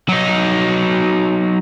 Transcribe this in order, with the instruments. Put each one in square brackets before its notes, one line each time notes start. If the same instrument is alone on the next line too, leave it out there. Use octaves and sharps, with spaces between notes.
[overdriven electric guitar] F#3 D#4